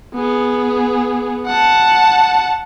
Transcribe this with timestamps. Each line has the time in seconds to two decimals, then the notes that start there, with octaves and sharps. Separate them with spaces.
0.14 B3 G#4
1.46 F#5 A5